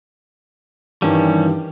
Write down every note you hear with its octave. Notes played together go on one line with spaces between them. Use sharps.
G2 D#3 E3 G3 C#4